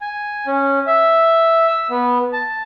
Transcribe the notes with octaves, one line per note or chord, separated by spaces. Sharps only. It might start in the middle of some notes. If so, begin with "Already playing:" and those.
G#5
C#4
E5
E6
B3
A5